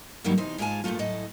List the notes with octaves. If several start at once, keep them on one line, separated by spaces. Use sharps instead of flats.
G2 D#3 F#3 G3 A#3
E2 C3 D#4 C5
G#2 G#3 F4 G4 G#5 A5
G2 A#2 C#3 A3 F4
F#2 A2 A4 D#5